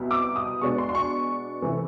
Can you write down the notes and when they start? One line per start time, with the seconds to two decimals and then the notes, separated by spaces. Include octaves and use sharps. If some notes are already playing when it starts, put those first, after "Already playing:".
Already playing: C2 B2 G3 B3
0.11 D6
0.36 D#6
0.61 B2 G#3 B3 D4 C#6
0.78 C6
0.89 C6
0.95 C#6
1.62 C3 E3 A3 C4